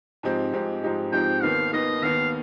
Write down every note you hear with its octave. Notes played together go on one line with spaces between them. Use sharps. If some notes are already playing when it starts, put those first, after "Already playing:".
G#2 F3 C4 D#4 G4
G#2 F3 C4 D#4 G4
G#2 F3 C4 D#4 G4
G#2 F3 C4 D#4 G4 G5
D#2 D#3 B3 F5
D#2 D#3 B3 D#5
D#2 D#3 B3 F5